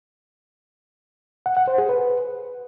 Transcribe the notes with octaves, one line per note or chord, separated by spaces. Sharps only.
F#5
F#5
C5
G#4
B4